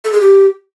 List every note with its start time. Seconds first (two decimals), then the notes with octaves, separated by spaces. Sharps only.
0.05 A4
0.12 G#4
0.20 G4